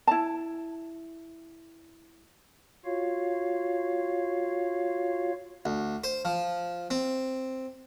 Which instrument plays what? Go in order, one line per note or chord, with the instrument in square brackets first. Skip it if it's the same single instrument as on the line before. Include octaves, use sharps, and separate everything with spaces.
[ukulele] E4 A5
[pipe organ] F4 F#4 C#5 F5
[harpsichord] D2
C5
F3
C4